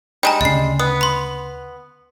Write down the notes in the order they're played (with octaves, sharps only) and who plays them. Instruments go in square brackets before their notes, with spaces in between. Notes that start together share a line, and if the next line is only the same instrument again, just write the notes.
[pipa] G3 G#3 [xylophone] G5 G#5 A#5
[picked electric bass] D2 C#3 [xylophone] D#5 C7
[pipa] B3 [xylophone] D#6
[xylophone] B5 C6